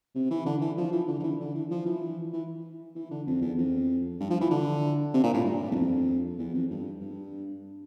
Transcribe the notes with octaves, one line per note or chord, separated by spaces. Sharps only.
C3
E3
D3
E3
F3
E3
D3
D3
E3
D3
E3
F3
E3
E3
E3
D3
F2
E2
F2
G2
F3
E3
D3
C3
A#2
A2
G2
E2
F2
E2
F2
G2
G2